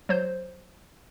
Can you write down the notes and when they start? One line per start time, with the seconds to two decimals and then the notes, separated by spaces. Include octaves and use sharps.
0.09 F#3 C5 G6